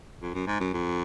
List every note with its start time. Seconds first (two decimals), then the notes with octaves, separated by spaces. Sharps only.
0.22 F2
0.34 F#2
0.47 G#2
0.60 F#2
0.73 F2